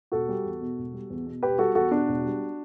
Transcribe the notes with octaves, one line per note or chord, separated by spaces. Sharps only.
E1 F#4 A4
G3
E2
B2
E1
G3
E2
B2
E1 G4 B4
G3 F#4 A4
E2 F#4 A4
B2 D4 F#4
E1
G3